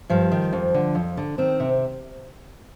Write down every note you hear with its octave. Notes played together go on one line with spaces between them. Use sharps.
G2 F3
D#3
F2
D3
F2
D3
D#3 C4
C3